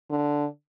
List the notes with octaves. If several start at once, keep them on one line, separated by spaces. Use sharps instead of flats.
D3